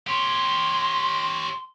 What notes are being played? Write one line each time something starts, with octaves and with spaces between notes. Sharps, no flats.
G4 C#5 C6